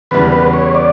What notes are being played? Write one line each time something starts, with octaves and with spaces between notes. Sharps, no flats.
E2 C#3 E3 G3 B4
B4
C#5
D5